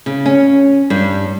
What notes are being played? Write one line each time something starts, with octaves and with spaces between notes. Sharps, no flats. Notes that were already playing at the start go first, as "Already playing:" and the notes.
C#3
C#4
G2